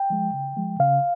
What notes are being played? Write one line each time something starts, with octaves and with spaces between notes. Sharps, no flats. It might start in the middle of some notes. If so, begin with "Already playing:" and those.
Already playing: G5
F3 G#3
C#3
F3 G#3
C#3 F5